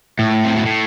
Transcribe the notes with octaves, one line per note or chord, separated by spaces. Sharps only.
A2
C3
B2
A2